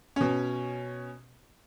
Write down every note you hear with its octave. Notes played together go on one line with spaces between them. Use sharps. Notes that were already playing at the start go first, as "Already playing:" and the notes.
B2 C#4